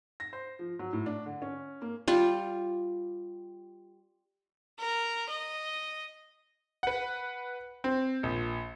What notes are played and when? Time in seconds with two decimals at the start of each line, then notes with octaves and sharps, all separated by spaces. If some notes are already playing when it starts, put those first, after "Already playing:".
0.20 A#6
0.33 C5
0.59 F3
0.79 F#3
0.93 A2
1.06 D4
1.26 D3
1.42 C#4
1.82 A#3
2.08 G3 F4
4.79 A#4
5.29 D#5
6.83 B4 F#5
7.84 C4
8.23 A#1